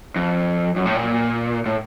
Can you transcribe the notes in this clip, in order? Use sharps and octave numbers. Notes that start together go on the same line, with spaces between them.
F2
F#2
A2
A#2
A2